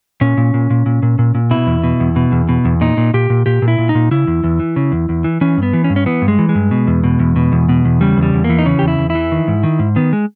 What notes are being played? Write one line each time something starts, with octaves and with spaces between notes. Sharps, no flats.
A#2 C#4
A#2
A#2
A#2
A#2
A#2
A#2
A#2
B2 E4
E2
B2
E2
B2
E2
B2
E2
A#2 D#4
A#2
A#2 G4
A#2
A#2 G4
A#2
E4
A#2
D#4
A#2
C#3 E4
E2
E2
E3
C#3
E2
E2
E3
E3 C#4
G2
B3
E3
C#4
G2
C#4
E3 B3
G2
G#3
E3
G#3
G2
B2
E2
B2
E2
B2
E2
B2
E2
C#3 G3
E2
G3
E2
A#3
E3
D#4
C#3 C#4
E2 G4
E4
E2
E4
E3
D#3
G#2
D#3
G#2
D#3 B3
G#3